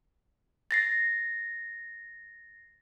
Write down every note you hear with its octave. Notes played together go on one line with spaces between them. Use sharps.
A6 A#6 C7